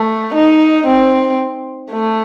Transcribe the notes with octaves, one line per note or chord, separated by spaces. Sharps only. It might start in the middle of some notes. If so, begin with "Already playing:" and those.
Already playing: A3
D#4
C4
A3